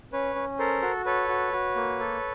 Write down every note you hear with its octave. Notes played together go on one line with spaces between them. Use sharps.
C#4 B4 C#5
C#4
A4 A#4 C5
F#4
A4 B4 C#5
F#4
F#4
A#3
A4